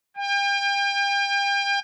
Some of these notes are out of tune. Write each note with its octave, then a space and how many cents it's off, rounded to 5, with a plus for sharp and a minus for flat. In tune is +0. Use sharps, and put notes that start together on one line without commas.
G5 +35